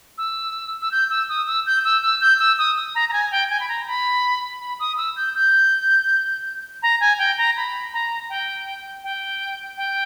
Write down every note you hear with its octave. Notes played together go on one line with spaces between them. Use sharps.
E6
E6
G6
E6
D#6
E6
G6
E6
E6
G6
E6
D#6
A#5
A#5
G#5
G5
G#5
B5
A#5
B5
B5
D#6
E6
G6
G6
A#5
G#5
G5
A#5
B5
A#5
G5
G5
G5